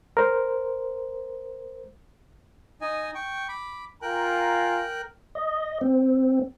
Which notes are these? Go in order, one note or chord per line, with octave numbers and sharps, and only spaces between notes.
A#4 C5
D#4 D#5 G#5
G5 C#6
B5 D6
F4 A#4 G5 G#5 A#5 F#6
D#5
C4